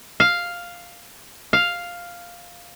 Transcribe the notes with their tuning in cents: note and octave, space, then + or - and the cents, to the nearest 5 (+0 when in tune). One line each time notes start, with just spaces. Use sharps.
F5 +0
F5 +0